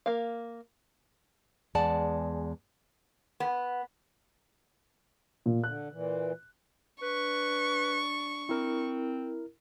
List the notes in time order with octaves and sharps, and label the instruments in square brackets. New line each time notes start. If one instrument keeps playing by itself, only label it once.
[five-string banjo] A#3 F5
[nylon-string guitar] E2 G#3 D5 F#5 A5
[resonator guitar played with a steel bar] B3
[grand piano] A#2
[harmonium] D3 [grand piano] F#6
[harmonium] A#2 E3
[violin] D4 C#6 [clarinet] B4
[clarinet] C4 [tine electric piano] E4 A#4